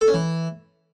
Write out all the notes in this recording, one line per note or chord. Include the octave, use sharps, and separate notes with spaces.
A4
C#4
E3